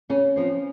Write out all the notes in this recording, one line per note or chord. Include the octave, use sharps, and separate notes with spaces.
C#3 C#4
F3 C4